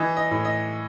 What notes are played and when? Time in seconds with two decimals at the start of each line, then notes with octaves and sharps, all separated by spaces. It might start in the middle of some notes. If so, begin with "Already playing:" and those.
Already playing: E3 D#5
0.17 D#5
0.31 A2
0.45 D#5